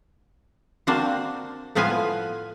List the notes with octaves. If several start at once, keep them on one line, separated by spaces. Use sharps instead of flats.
A#3 C4 D4 F#4 C5
A2 F3 B3 F4 B4 G#5